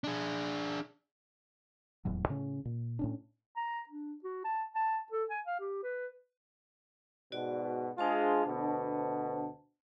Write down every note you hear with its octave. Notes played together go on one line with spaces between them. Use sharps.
D4 G#4
D#1 E2 A2 F#3
A2 C#3 C#4
A#2
A2 C#4 D4
A#5
D4
F#4
A5
A5
A4
G#5
F5
G4
B4
G#2 B2 F#4 D5
G#3 D4 F4 G#4 C5 A5
D2 B2